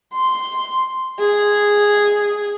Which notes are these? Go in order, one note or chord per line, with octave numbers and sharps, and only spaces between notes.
C6
G#4